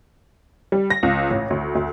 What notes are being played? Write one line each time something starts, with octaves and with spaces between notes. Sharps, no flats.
G3
A#6
C#2
A1
D2
D2